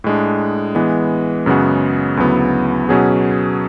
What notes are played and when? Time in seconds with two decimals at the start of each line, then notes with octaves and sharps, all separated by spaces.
0.04 A2 G#3 D4
0.75 E3 G#3 B3
1.46 F#2 C#3 G#3 B3 F#4
2.17 D2 C#3 F#3 B3 E4
2.89 B2 F#3 C#4 G#4 B4